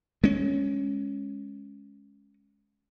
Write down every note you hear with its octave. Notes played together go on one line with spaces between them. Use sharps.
G#3 C#4